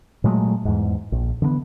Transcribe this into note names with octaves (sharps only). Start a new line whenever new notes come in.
A#2 F#3 G#3 A3
E2 G#2
A#1
D3 E3 A3 B3